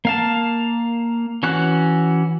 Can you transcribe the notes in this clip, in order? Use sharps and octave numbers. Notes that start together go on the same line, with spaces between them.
A#3 F5 A5
E3 C#4 F#4 F#6